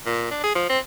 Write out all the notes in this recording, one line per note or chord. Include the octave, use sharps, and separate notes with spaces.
A#2
D4
G#4
F3
C4